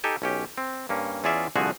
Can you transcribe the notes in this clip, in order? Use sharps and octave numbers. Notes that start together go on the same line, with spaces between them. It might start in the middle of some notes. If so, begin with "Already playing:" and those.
D#4 G4 A4 G#5
B1 C#4 G4
C4
G2 A#3 C#4
E2 C#4 F4 G#4 D5 E5
C2 D3 F3 F#4 G#4 G#5